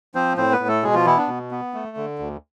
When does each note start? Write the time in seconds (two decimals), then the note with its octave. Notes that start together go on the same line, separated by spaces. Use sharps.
0.15 F3 C4 C5
0.37 A2 C4 C5
0.52 B3 B4
0.60 A2
0.68 A3 A4
0.83 B2 G#3 G#4
0.94 F3 F4
1.05 E3 B3 E4
1.17 D4
1.28 B2
1.51 B3
1.74 A3
1.97 D3
2.19 D2